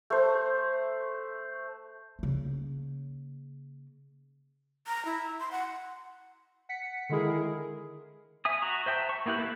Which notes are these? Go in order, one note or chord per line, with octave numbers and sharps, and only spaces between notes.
A3 C5
C#3 A#3
A#5
E4
C6
F#5
F#5 B6 C#7
D3 D#3 G#3 E4 G#4 A#4
E5 G#5 D#6
F#4 A#5 C#6
C5 E5 G5 A5
C#6
A#3 B3 E4 G4 F#5
A#3 A4 E5 F#6